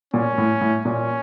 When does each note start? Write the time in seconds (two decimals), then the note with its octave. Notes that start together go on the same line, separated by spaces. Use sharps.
0.14 A#2 C#4
0.38 A2
0.61 A2
0.85 A#2 C#4